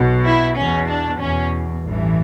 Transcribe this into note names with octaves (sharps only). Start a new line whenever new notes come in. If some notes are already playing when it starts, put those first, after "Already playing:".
Already playing: B1 B2
E4
E2 B2 C#4
D4
E2 B2 C#4
A1 G2 E3